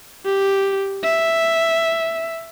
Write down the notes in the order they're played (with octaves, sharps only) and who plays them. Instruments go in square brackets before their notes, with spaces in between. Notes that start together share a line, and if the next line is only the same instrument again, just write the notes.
[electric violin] G4
E5